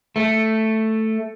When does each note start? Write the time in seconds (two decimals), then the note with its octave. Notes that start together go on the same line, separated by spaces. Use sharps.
0.16 A3